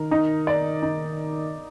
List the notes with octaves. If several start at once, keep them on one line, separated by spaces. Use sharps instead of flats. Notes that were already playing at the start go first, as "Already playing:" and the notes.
Already playing: D#3 A#4
D#4
D5
D#4